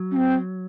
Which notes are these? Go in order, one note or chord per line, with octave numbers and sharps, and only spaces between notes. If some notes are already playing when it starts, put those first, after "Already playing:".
Already playing: F#3
C#4
C4